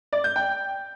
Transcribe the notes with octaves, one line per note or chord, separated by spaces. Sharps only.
D5
G6
G5